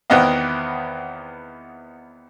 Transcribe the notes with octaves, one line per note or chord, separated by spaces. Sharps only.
E2 D#3 B3 C4 D#5 F5